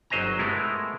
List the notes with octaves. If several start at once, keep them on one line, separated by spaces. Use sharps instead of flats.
G1 F#3 C5 D#5 G#5 A#5
G#3 A3 B3 E4 A#4